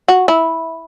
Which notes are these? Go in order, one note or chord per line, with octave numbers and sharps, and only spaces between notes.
F#4
E4